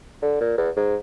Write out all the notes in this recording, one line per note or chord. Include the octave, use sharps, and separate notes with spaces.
D3
A#2
E2
G#2